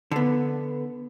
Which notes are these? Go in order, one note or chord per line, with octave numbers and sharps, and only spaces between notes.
D3 B3